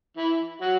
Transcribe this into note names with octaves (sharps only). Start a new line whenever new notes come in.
E3 E4
F#3 F#4